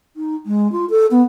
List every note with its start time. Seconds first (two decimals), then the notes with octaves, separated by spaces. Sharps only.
0.16 D#4
0.46 G#3
0.72 F4
0.90 A4
1.11 B3